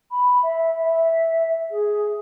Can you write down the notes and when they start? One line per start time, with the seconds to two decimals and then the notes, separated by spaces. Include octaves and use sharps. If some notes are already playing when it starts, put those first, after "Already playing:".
0.11 B5
0.42 E5
0.82 E5
1.70 G#4